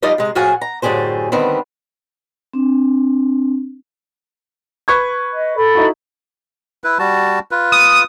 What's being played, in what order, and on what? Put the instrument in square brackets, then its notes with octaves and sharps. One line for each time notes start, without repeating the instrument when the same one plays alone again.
[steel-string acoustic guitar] F3 G3 D#4 F4 D5 D#5
C3 G#3
A2 F3 F4 F#4 G#4 G#5
A#5
F#2 A2 D3 G4 G#4 C5
D3 D#3 G3 B3 C4
[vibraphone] C4 D4
[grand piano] B4 C#6 G#6
[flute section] D#5
A4 B5
[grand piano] D#4 E4 F#4
[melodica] E4 B4
G3 F#4 A5
F4 B4
[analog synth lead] D#6